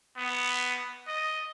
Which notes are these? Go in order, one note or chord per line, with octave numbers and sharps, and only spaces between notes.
B3
D#5